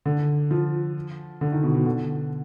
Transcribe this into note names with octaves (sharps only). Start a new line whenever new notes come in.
D3
F3
D3
D#3
B2
B2
D3